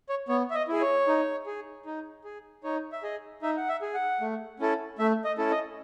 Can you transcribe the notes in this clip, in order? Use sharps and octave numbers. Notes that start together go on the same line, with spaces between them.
C#5
B3 C#5
E5
D#5
E4 G#4
C#5
D#4
G#4
D#4
G#4
D#4 C#5
E5
G#4 D#5
D#4 E5
F#5
E5
G#4
F#5
A3
C#4 E4 A4
A3 E5
D#5
C#4 E4 A4
D#5